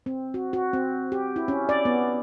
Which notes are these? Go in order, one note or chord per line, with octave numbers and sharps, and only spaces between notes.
C4
F#4
F#4
C4
G4
E4
C#4
D5
B3